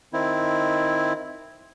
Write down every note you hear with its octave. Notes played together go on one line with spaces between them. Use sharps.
D#3 C4 E4